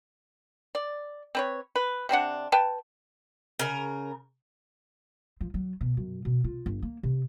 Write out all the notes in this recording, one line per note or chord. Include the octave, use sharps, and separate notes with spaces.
D5
C4 B4 C#5
B4
C3 C4 D4 F#5
B4 G5 A5
C#3 A#4
F3
F#3
B2
F#2
B2
F4
G1
A#3
C3